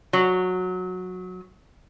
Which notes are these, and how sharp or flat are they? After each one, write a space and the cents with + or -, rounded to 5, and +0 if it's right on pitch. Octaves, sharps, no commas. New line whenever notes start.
F#3 -15